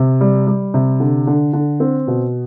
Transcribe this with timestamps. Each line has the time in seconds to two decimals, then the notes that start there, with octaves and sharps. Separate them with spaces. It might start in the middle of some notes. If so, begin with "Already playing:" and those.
Already playing: C3
0.21 G3
0.47 G3
0.74 C3
1.00 D3
1.27 D3
1.53 D3
1.80 C4
2.07 B2